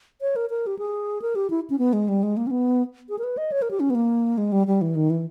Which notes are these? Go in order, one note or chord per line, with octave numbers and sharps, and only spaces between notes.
C#5
A#4
A#4
G4
G#4
A#4
G4
E4
C#4
B3
G#3
G3
G#3
A#3
C#4
B3
G#4
A#4
B4
D#5
C#5
A#4
G4
C#4
B3
A#3
G#3
G3
G3
E3
D#3
E3